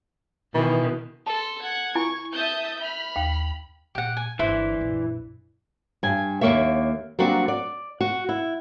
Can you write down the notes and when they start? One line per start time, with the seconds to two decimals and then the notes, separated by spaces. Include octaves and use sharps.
0.55 B2 D#3 E3
1.27 A4 A5 C6
1.62 F#5 G#6
1.95 E4 G#5 B5 C#6
2.34 E5 A5 D#6 G6
2.82 B5 F6
3.16 D#2 F5 G5
3.95 A#2 G4 F#5
4.17 G#5
4.39 G1 E3 E4 C5 D5
4.81 A#1 F#2
6.03 G2 G#5
6.41 D#2 G#3 A#3 C#5 E5
7.19 F#3 G3 A#3 C4 D4 F#4
7.48 D5
8.00 F#4
8.29 E4